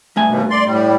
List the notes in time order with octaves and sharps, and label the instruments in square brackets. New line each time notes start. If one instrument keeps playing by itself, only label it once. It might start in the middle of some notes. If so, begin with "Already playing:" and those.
[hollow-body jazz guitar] G2 A3 G#5
[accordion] D#2 B2
D5 C6
A2 G3